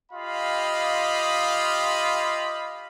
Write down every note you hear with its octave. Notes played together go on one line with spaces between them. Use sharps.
F4 G4 D#5 F5 B5